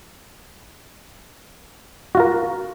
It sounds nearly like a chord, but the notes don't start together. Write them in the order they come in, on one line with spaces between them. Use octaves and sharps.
F#4 F4 A#4